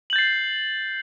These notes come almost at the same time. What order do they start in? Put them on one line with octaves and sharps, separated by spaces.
F#7 G6 A6 C7